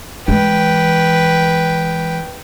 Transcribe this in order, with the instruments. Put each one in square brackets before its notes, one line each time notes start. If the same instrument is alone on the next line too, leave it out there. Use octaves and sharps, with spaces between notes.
[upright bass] E3 G#3 [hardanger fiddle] B4 G5